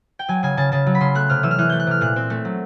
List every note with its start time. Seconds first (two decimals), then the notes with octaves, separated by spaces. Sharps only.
0.19 G5
0.28 F#3 G#5
0.43 C#3 G#5
0.57 C#3 A5
0.72 C#3 A5
0.86 F#3
0.95 B5
1.00 C#3 C6
1.15 A3 F#6
1.29 C3 F6
1.43 E3 E6
1.51 F6
1.58 E3 F#6
1.69 A3 G6
1.80 F#6
1.87 C3 F6
2.01 A#2 F#6
2.16 C4
2.30 A3
2.45 F#3